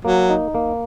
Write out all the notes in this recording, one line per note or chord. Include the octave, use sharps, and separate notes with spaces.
F#3 A#3
D#4
A#3